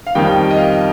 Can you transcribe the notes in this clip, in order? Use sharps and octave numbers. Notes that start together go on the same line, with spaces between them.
F5
F2 D#3 G3 G5
D#5
F5